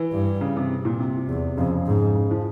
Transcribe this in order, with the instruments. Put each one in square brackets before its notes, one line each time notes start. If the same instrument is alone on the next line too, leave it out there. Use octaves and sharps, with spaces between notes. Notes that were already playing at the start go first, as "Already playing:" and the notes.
Already playing: [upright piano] E3
[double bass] G2
[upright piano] C#3
C3
A#2
C3
[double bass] E2
[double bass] F2 [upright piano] C#3
[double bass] G#2
[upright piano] C#3
F3